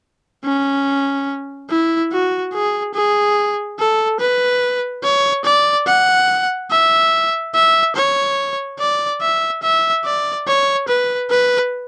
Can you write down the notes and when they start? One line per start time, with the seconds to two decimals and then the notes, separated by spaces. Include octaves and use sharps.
0.44 C#4
1.70 E4
2.12 F#4
2.54 G#4
2.95 G#4
3.79 A4
4.20 B4
5.04 C#5
5.45 D5
5.87 F#5
6.71 E5
7.55 E5
7.96 C#5
8.79 D5
9.22 E5
9.63 E5
10.05 D5
10.47 C#5
10.88 B4
11.30 B4